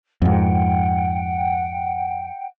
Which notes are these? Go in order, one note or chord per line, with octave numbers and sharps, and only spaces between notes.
F2 G#2 F#5 G5